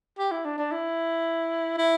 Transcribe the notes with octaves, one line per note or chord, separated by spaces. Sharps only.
G4
E4
D4
D4
E4
E4